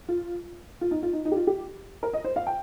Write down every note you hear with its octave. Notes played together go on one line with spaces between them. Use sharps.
F4
F4
D#4
F4
D#4
D#4
G4
F4
G4
A#4
D#5
C5
F5
G5